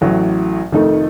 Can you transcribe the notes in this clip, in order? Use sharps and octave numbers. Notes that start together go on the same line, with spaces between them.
A1 A2 F#3
F1 F2 D#3 A3 D#4